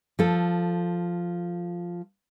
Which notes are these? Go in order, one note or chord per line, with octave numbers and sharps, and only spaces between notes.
F3 A4